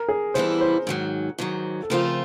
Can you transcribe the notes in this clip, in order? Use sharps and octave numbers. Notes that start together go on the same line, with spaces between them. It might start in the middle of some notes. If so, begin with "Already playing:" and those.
Already playing: A#4
G#4
A2 E3 G3 B3 E4 C5
C5
G#2 D#3 F#3
G#2 D#3 F#3
A4
C#3 F3 A3 C4 F4 A#4